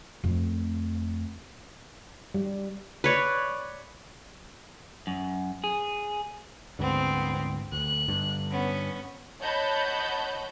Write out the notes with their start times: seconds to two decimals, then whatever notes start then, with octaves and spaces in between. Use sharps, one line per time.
0.24 F2 A3
2.34 G3
3.04 B4 C#5 D5
5.07 F#2
5.64 G#4
6.79 D2 G#2 D3 B3 C4
7.72 D2 F#6
8.08 G2 D3
8.51 B3 C#4
9.40 C#5 D#5 F#5 A5 B5 G6